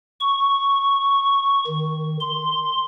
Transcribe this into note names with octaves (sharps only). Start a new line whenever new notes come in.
C#6
D#3
C6